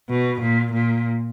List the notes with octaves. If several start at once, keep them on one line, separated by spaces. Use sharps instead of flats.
B2
A#2
A#2